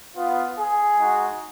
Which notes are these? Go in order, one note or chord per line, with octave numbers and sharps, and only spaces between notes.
B3 F4
G#4
G#3 D#4 F#4